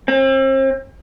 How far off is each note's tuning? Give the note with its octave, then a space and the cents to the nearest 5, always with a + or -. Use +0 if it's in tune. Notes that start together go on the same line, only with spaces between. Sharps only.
C4 +40